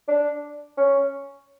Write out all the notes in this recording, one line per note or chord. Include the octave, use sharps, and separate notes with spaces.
D4
C#4